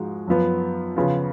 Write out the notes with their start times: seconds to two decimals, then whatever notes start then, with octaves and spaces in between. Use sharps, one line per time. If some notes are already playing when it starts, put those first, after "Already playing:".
Already playing: G#2 F3 G#3 F#4
0.27 F#2 F3 B3
0.96 C#3 F3 B3 F4